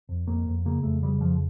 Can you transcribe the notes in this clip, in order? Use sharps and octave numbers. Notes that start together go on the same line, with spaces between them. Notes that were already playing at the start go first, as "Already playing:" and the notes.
F2
F2 A#3
F2
C#3 A#3
F2 A3
C#3 G3
F2 F3